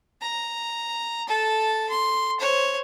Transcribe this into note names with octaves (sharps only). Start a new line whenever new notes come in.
A#5
A4 A5
C6
C5 C#5